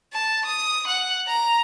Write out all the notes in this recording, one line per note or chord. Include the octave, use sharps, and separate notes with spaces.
A5
D#6
F#5
A#5